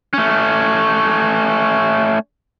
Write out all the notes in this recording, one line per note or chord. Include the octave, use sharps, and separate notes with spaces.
A3 C#4